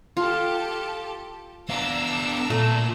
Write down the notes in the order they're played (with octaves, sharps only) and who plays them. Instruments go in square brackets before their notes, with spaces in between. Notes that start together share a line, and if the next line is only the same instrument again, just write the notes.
[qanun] F4 [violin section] G4 A4 A5
[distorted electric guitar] B3 F5 [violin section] D4 A#5 E6
[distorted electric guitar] A#2 [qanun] A3